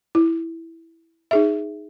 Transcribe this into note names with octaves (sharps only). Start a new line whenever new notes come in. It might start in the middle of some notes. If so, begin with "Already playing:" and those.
E4
D#4 G#4 E5